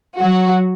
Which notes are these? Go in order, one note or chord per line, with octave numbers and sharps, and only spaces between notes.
F#3 F#4